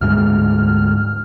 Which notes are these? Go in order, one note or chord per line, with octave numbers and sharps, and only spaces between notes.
D2 G#2 G#3 F6